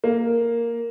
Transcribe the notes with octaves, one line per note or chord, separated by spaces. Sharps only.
A#3